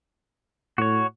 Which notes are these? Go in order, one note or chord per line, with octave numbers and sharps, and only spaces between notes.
A2 F#4 C#5